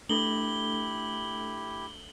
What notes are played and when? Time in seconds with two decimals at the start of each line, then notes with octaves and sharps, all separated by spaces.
0.09 A3 D4 E4 G4 A4 F#7 G7